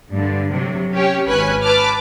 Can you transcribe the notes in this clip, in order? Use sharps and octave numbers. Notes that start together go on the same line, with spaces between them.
G2 D3
C3 F#3
C#4 G4 C#5
G#1 C#4 B4 G#5 F#6
B4 A5 D6 F6